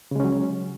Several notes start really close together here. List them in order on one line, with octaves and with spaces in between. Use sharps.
C#3 G#3 C#4 F#3